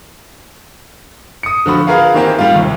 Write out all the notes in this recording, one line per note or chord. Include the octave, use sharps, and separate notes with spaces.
D#6 C#7
D3 F3 F#4 B5
F4 G#4 A#4 B4 F5 F#5
D#3 E3 A#3 C4 G4 A#4
G3 F4
D#2 C3